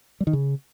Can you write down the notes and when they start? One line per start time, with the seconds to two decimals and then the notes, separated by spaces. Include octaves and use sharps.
0.20 G3
0.27 D#3
0.33 C#3